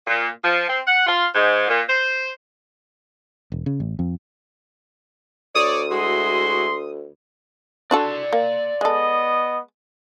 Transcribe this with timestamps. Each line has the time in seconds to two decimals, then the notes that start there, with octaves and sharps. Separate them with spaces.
0.06 A#2
0.43 F3
0.68 C4
0.86 F#5
1.06 F4
1.34 G#2
1.67 A#2
1.87 C5
3.52 E1
3.66 C#3
3.80 A1
3.99 F2
5.55 D2 C#5 D5 D#6
5.91 G#3 E4 F#4 C6
7.91 D4 F#4 A4 D5 C6
8.33 A#3
8.81 G#3 B3 A4 D#5